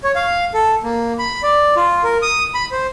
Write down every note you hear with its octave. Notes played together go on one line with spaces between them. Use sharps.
C#5
F5
A4
A#3
B5
D5
F4
A#4
D#6
B5
C5